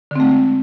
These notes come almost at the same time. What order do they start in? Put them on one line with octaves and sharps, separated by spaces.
D3 C4 A3 G#3